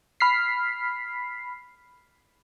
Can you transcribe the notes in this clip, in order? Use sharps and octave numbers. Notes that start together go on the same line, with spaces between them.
B5 F6 B6 C7